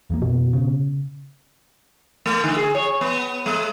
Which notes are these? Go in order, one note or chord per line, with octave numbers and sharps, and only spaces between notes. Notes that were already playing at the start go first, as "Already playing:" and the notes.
E2 F3 A#3
F2 B2
C#3
A3
D3
G#4
C#5
B3
G#3